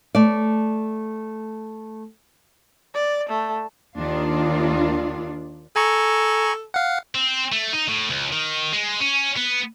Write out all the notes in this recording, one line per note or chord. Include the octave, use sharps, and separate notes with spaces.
A3 D5
D5
A3
D#2 D#3 D4 F4
A4 G#5 A#5 C#6
F5 F#5
C4
A3
D#4
A2
C#2
D#3
G#3
C#4
B3